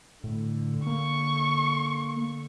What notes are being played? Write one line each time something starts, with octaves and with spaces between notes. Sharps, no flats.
A2 D3
A#3 C#6